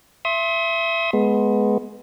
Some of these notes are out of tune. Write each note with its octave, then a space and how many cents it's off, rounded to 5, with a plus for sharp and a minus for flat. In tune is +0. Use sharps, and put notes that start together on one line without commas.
E5 +20 C6 +20 D#6 +40
G#3 +15 B3 +0